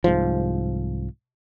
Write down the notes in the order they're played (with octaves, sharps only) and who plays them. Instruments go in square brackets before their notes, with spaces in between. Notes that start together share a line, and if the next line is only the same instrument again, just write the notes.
[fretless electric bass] C2 G#2 F3